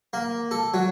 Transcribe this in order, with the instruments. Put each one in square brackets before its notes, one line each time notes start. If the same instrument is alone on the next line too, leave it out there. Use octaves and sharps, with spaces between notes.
[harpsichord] A#3
A4
F#3